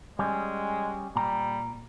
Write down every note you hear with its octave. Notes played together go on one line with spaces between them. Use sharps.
G3 G#3 C#4
A#2 G3 A#5